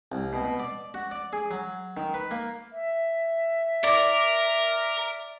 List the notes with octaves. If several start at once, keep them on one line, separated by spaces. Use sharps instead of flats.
C2
B2
B2
D5
F#4
D5
G#4
F#3
D#3
B4
A#3
E5
A#4 D5 D6